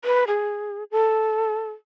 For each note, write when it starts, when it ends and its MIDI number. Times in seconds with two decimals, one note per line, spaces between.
0.05 0.24 71
0.28 0.84 68
0.91 1.69 69